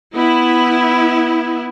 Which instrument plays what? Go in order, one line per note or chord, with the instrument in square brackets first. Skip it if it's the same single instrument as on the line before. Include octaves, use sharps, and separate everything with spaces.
[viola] B3 [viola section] E4